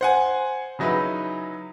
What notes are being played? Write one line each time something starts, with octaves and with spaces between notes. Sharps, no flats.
C5 F#5 G#5
C#3 F#3 D#4 E4 B4